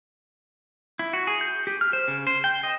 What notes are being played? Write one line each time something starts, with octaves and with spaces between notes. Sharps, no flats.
E4
F#4
G#4
G6
G4
F6
C5
C#3
C5
G5
D#5